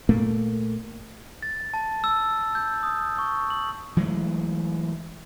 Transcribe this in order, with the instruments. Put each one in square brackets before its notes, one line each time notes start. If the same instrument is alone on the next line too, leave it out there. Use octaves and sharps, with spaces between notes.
[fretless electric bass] A#2 A3 A#3
[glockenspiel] A6
A5
E6
G6
D#6
C#6
F#7
[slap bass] E3 F#3 G#3 A3